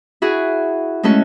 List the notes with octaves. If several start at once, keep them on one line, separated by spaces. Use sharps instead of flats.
E4 F#4 G#4
G#3 A3 C#4 F#4 A4